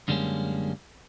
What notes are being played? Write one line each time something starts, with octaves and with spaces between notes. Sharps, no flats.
F#2 D3 G3 G#3 A#3 C#4